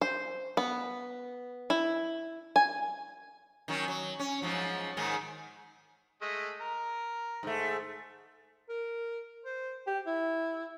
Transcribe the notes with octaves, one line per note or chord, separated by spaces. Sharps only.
C5
B3
E4
G#5
D#3 F#3 C#4
F#3
C#4
G#2 F3 F#3
G#2 D#3 G#3
G#3 A3 D#5
A#4 A#5
G#2 A3
A#4
C5
G4
E4